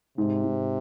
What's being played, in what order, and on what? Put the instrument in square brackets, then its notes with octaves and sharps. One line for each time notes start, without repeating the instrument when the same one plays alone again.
[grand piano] G#2 [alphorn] C3
[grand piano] G#2